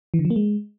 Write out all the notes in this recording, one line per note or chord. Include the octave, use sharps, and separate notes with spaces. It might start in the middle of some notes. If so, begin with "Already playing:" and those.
E3
D3
F3
A#3
G#3